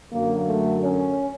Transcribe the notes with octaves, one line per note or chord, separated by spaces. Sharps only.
F#2 D3 F#3 A#3
A3
C#4